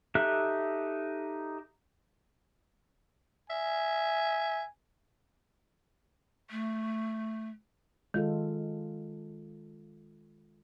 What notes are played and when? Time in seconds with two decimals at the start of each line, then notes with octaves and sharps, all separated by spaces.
0.15 D#4 G4 A4 E5 F#6
3.50 E5 G#5
6.50 A3
8.14 D#3 G#3 F4 A4